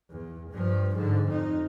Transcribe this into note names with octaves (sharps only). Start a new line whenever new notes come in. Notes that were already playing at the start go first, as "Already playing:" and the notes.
E2
G2 F3
G#2 D3
F2 D#4